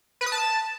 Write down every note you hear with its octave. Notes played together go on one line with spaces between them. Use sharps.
B4
D#6
A5